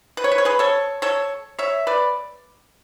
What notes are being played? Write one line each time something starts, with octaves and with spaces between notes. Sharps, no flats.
B4
C#5
B4
C#5
G#4 B4
A4 C#5
A4 C#5
C#5 E5
B4 D5